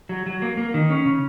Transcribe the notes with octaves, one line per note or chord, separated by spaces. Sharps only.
F#3
F#3
A#3
A#3
D#3
C#4
C#3